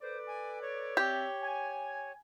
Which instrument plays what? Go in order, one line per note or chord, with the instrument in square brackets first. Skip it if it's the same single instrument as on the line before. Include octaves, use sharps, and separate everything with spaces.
[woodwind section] A4 B4 D5 [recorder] C5
[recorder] G#5
C#5
[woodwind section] C4 D5 E5 [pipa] G4
[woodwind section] G#5